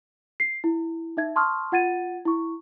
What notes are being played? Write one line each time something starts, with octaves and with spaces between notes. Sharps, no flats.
C7
E4
D#4 E5 G#6
A5 C6 C#6 D#6 F6
F4 F#5 G#6 A6 D#7
E4 C#6